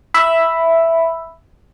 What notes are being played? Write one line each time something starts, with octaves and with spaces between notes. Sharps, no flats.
E5 B5